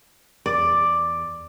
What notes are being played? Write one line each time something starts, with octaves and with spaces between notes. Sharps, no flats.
E2 D5